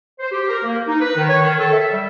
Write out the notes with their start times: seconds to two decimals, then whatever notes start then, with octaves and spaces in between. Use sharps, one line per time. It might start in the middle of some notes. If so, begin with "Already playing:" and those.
0.20 C5
0.32 G4
0.48 A#4
0.64 A#3
0.88 D#4
1.00 B4
1.16 D#3
1.28 C#5
1.42 D#3
1.59 A4
1.73 E5
1.92 G3